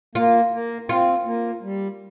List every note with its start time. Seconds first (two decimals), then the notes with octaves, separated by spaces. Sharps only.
0.15 A#3 F4
0.52 A#3
0.89 C4 F4
1.25 A#3
1.62 G3